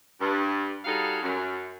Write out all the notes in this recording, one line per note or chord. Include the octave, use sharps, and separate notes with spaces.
G2
G3 D#4 F#4 G#4 A4 F5
F#2